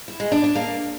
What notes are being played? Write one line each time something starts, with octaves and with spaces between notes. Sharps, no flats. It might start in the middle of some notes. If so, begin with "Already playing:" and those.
E4
G#3
D4
D4
A#3